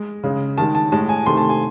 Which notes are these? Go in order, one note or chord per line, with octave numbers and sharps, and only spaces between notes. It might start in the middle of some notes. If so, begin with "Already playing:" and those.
Already playing: G#3
C#3 G#3
D#3 G#3 A5
A5
A2 G#3 A5
G#5
C3 D#3 A3 C6
A5
G#5